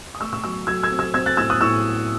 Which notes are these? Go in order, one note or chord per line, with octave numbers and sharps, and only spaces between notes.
D#6
A3 C#6 E6
C#6 E6
F#3 C#6 E6
F#3 E6 G#6
E6 G#6
C4
E6 G#6
C4 E6 G#6
F#6 A6
A2 E6 G#6
D#6 F#6
A2 C#6 E6